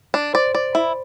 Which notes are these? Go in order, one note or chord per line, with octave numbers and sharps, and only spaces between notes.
D4
C5 D5
D5
E4